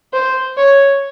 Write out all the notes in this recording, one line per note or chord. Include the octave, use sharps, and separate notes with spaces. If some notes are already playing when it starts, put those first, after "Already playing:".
C5
C#5